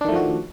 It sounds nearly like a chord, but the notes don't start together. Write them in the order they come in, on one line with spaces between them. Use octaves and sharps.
D4 D#3 A3 F3 F#4